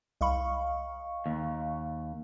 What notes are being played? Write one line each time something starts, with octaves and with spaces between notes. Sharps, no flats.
C2 D#5 F5 B5 C#6
D#2